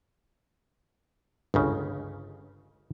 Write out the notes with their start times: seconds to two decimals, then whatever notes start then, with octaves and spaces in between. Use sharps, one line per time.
1.54 G1 C#2 C#3